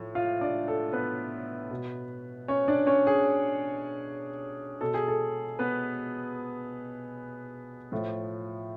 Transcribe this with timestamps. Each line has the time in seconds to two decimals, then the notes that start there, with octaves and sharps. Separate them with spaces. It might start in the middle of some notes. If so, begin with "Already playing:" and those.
Already playing: A2 F3
0.15 F4 F5
0.41 D4 D5
0.68 A4
0.93 B3 B4
1.71 B2
2.48 C#4 C#5
2.68 D4 D5
2.87 C#4 C#5
3.07 G#4
4.81 B2 A4
4.94 G#4
5.08 A4
5.59 B3 B4
7.92 A2 F3